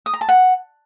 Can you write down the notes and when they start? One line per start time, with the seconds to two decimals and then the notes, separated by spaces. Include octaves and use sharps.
0.06 D#6
0.14 A#5
0.21 A5
0.29 F#5